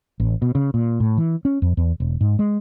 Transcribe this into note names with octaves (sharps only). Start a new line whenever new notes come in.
A1
B2
C#3
A#2
A2
E3
C#4
F2
E2
E1
G#2
G#3